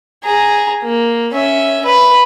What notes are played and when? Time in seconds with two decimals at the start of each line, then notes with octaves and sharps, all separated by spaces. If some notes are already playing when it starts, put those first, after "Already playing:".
0.24 G#4 A#5
0.82 A#3
1.34 C#4 E5
1.86 B4